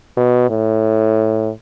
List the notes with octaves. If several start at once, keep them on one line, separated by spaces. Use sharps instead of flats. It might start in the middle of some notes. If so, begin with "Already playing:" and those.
B2
A2